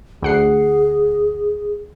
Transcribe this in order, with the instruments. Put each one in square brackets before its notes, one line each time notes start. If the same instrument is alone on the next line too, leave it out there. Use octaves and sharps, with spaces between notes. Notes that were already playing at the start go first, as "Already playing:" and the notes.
[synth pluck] D2 F#5 C7 [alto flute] G#4